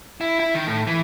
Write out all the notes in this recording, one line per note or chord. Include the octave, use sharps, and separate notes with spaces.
E4
E4
D#3
A2
E3